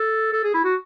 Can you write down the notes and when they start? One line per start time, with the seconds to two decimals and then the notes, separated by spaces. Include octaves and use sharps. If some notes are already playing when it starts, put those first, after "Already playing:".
Already playing: A4
0.33 A4
0.44 G#4
0.54 E4
0.64 F#4